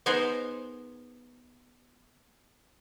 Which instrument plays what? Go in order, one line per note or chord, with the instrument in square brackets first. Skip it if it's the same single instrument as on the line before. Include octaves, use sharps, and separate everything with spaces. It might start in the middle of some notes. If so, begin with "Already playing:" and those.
[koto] B3 D#4 G#4 A#4 C5